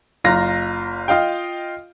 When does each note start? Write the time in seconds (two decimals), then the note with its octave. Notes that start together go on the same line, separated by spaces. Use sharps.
0.24 F#1 F4 A#5 A#6
1.08 F4 D#5 F5 G5